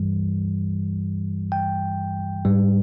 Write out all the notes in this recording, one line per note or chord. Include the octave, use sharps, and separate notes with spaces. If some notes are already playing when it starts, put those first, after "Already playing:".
Already playing: G2 E3 G3
G5
G#2 G3